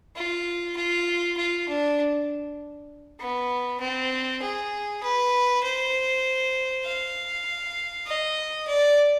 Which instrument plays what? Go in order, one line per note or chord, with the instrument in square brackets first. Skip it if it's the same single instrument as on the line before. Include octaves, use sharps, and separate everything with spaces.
[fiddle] F4
F4
F4
D4
B3
C4
G#4
B4
C5
F5
D#5
D5